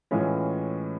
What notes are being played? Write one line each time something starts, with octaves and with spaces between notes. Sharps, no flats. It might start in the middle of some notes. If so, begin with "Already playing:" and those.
A2 E3 G#3 C#4 F4